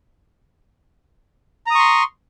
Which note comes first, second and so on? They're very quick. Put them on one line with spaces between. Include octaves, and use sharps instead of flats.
A#5 D#6 C#6 C6